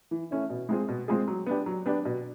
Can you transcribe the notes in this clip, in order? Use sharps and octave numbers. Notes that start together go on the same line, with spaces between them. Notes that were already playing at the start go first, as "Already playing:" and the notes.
E3
A3 C#4 E4
B2
G#3 C4 F4 G#4
B2
G#3 C4 F4 G#4
F#3
B3 D4 G4
F#3
B3 D4 G4
B2